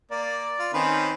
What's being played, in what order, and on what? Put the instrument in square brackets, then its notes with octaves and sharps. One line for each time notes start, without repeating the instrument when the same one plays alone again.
[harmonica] A#3 [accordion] D5
[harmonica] F4
[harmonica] D#3 B4 [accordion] C4 C#4 C5